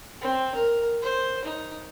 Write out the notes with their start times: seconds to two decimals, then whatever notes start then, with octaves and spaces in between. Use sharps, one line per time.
0.21 C4
0.55 A#4
1.02 C5
1.45 D#4